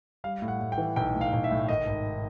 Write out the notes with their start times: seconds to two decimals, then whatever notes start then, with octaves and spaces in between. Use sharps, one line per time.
0.24 G3 F5
0.42 A2
0.48 F#5
0.61 A2
0.72 G5
0.78 E3
0.96 B1 G5
1.15 A2
1.21 F5
1.33 B1
1.44 E5
1.51 A2
1.68 G#1 D#5
1.87 G#1